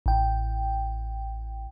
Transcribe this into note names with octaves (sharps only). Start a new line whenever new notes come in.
A1 G5